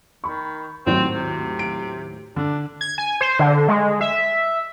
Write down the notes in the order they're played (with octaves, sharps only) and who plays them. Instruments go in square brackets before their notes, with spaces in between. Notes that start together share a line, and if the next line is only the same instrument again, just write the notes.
[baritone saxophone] D#3 [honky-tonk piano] B5 C#6
[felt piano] G#1 [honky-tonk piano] D#2 A2 F#3 [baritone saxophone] C4
[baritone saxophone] C3
[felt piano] D7
[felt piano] D3 [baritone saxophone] D4
[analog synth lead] G#6
G#5
C5
D3
G#3
E5